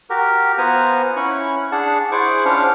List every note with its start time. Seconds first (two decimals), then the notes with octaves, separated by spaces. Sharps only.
0.10 F#4 G4 A#4
0.58 B3 F4 B4 C5 G#5 A#5
1.16 C#4 E4 C#6 F#6
1.72 D4 G#4 F#5 A5
2.12 E4 G#4 C5 F#5 C#6 D6
2.45 C#4 D4 F4 C5 F5 F#5